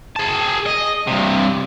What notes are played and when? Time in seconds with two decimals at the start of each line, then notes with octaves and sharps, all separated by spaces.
0.16 G#4 A5
0.66 D#5
1.07 G2 C3